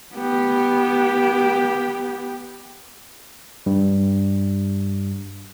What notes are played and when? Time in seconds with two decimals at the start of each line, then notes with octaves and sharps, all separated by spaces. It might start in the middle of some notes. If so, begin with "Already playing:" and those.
0.15 B3 G4
3.66 G2 G3